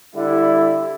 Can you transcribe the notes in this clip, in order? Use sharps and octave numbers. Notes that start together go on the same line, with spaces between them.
D3 G3 E4